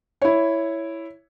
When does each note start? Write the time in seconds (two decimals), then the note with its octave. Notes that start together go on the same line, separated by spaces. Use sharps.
0.22 E4 C#5